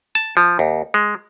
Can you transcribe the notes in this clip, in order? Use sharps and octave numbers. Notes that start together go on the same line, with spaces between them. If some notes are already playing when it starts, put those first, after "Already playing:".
A5
F3
D#2
G#3